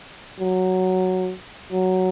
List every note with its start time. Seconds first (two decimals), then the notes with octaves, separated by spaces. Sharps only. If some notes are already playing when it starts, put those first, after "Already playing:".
0.40 F#3
1.72 F#3